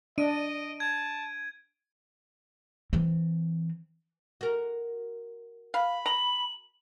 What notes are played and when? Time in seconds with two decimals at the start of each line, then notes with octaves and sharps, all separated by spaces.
0.18 D4 D#5 D7 D#7
0.80 A5 G#6
2.93 E3 C4
4.41 F#4 A#4
5.74 F5 B5
6.06 A#5 F#7